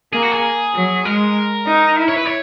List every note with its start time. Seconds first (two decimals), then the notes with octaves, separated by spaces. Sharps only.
0.13 A#3 G#4
0.23 F#4
0.32 G#4
0.75 F#3
1.05 G#3 A#4
1.67 D#4
1.98 E4
2.08 C#5
2.17 B4
2.26 C#5